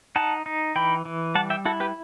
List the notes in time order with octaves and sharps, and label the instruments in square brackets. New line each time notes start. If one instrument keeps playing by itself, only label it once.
[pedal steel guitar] D#4 F#5 A5
D#4
E3 G5 B5
E3
G3 F#5 A5
E5 G5
E4 F#4 A4
G4 B4